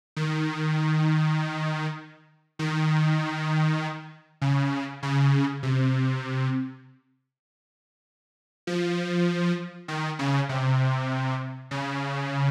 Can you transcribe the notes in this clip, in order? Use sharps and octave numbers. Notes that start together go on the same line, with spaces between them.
D#3
D#3
C#3
C#3
C3
F3
D#3
C#3
C3
C#3